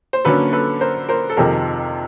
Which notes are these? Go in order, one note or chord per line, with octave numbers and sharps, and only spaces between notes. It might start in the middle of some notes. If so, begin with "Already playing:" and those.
C5
D3 F#3 A#3 C#4 A4 B4
A4 B4
A#4 C5
A#4 C5
A4
F2 C3 D#3 G#4 A#4